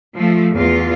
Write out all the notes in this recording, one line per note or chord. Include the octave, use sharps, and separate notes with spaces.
F3 A3
E2 F4